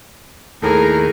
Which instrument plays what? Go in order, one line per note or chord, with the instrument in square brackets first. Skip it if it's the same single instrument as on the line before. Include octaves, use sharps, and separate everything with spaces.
[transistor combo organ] D#2 [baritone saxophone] A2 [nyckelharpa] G#4 [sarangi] A#4